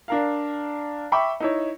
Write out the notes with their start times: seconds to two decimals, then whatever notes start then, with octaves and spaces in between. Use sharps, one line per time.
0.08 D4 A#4 F5
1.12 E5 G5 B5 C#6 D6
1.40 D#4 E4 C#5